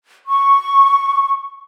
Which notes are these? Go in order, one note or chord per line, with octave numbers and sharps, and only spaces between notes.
C#6